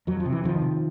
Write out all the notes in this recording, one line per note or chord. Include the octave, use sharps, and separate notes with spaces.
F2 F#3
F3
C3
E3
F2 D#3 F3
C3